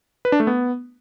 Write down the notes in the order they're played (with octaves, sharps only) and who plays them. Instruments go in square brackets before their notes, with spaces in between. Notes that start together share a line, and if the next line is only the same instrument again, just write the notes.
[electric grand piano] B4
D4
A3
B3